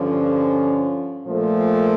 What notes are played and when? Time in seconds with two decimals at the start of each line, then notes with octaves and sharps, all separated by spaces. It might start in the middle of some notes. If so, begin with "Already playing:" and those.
Already playing: G2 D3 F3 C#4
1.26 A#2 F3 A3